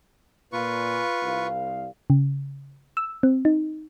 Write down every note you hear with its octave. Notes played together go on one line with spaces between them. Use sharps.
A#2 F4 B4 C#6
C2 F5
C#3
E6
C4
D#4